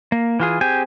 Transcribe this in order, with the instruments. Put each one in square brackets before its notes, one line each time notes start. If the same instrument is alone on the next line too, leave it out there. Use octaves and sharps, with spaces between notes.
[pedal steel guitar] A#3
E3 F4 G#4
C4 G4 G#4 G#5